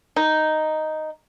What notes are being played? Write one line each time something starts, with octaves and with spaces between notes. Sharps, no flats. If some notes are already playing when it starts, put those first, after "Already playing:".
D#4